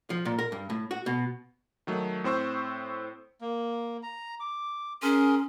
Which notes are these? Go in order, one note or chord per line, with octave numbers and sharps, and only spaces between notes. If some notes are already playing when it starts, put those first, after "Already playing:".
F3
A#2
A#4
G2
A2
F#4
B2
D#3 F#3 A3
A2 C4 C5 C#6 E6
A#3
A#5
D6
C#4 G#4 A#4 C6